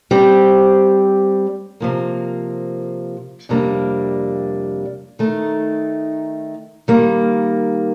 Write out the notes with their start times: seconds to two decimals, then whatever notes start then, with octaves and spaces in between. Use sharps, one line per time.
0.11 G3 C4 G4 C5
1.80 C3 F3 A#3
3.49 F2 C3 G3 A#3 D4
5.19 D#3 A3 D#4
6.88 D#3 G3 A#3